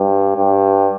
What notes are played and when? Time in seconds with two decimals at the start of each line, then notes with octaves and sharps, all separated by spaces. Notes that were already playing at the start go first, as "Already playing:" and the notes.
Already playing: G2
0.37 G2